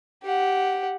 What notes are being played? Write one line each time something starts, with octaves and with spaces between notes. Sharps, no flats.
G4 F#5